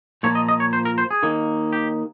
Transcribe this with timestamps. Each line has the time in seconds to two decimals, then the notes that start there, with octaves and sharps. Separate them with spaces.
0.23 A#2 F3 A#3 C#5
0.35 D#5
0.48 D#5
0.60 C#5
0.73 C5
0.85 A#4
0.98 C5
1.11 G#4
1.23 D#2 D#3 A#3
1.72 G4